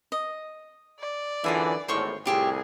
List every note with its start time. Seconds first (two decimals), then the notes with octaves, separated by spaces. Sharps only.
0.12 D#5
1.00 D5
1.44 F#2 D3 E3 F4 G#4 E5
1.88 G#1 E2 A2 C5 C#5 C#6
2.26 C2 A2 F4 G4 G#4 E5